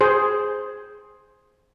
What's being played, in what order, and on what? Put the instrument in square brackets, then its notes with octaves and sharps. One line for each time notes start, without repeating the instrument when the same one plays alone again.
[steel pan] G#4 C5